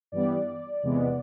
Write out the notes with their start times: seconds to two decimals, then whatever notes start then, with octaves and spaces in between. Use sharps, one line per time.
0.12 G2 E3 G3 B3 D5
0.83 E2 C3 E3 G#3 B3